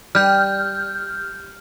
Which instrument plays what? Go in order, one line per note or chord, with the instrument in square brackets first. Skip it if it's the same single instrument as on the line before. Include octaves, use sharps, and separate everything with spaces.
[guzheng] G3 [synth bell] F6 G6